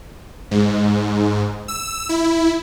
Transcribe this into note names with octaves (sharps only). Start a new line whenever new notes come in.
G#2
E6
E4